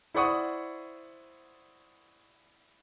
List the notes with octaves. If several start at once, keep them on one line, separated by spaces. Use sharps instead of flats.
E4 C5 D5 F#5 C#6 D#6